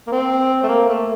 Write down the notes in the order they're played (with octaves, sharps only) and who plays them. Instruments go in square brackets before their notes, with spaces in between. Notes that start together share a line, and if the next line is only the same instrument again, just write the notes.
[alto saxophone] A#3
C4
A3
A#3
A3